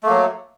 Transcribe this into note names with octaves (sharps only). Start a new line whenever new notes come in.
F#3 A3 A#3